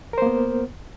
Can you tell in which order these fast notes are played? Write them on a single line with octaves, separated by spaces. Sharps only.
A#4 C5 A#3 B3